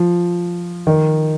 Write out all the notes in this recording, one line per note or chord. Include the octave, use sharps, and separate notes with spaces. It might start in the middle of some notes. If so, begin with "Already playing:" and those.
Already playing: F3
D#3